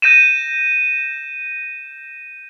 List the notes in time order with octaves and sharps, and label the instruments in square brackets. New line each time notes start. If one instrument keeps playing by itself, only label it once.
[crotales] G6 A#6 D#7 E7